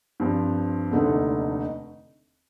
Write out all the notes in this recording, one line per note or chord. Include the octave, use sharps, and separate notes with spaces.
G2 F3 C4
F1 D#2 D3 A3 D#4